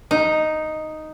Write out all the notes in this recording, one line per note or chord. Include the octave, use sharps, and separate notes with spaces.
D#4